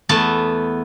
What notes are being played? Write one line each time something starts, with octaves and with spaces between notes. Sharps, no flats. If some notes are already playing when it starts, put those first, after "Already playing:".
E2 A3 B3 A5